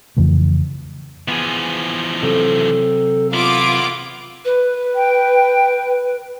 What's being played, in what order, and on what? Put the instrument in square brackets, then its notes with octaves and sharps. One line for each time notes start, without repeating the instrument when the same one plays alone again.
[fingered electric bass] F2 C#3 E3 A3
[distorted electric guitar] E3 F3 [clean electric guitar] B3 G#4
[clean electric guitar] C3 F#3 C4 [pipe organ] A4
[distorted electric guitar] B3 E4 [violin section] F4 D6
[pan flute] B4
[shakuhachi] G5